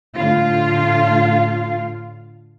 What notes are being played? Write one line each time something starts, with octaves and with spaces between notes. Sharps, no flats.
A2 D3 F4 F5